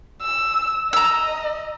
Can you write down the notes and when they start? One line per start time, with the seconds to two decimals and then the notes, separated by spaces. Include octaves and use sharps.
0.22 E6
0.93 D#5 A#5 E6